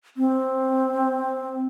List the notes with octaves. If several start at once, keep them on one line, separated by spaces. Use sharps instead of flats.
C4